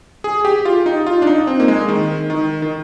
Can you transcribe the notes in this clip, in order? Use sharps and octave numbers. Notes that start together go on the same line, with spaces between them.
G#4
G4
F4
D#4
F4
D4
D#4
C4
A#3
G#3
D#3
D#3
D#3